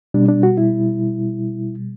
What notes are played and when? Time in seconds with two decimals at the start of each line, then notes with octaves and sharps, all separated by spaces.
0.14 B2 G3 D4
0.29 D4
0.43 F#4
0.58 E4